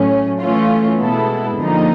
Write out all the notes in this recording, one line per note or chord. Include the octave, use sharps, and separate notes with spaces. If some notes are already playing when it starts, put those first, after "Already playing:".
Already playing: A2 F#3 A3 C#4
E3 A3 C#4 F4
B2 G#3 B3 E4 A4
F2 D3 F3 A#3 D#4